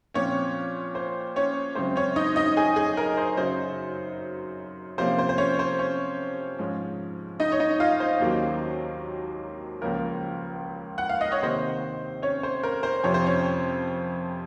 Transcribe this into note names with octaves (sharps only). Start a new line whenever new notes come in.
A#2 F3 C4 C#4 C#5
C5
C#4 C#5
F#2 C#3 G#3 C4 C5
C#4 C#5
D#4 D#5
D#4 D#5
G#4 G#5
G#4 G#5
A#4
C5
F#2 C#3 F#3 C5
C3 F3 A#3 C#4 C5
C5
C5
C#4 C#5
C5
C#4 C#5
G#2 F3 G#3 C#4
D#4 D#5
C#5
D#4 D#5
F4 F5
C5
D#2 D#3 F#3 A#3 C#4
C#2 C#3 F3 A#3 C#4 A#4
F#5
F5
D#5
C#5
C3 D#3 A#3 C5
C#4 C#5
C5
A#4
C5
F2 C3 F3 C#5
C5
C#4 C#5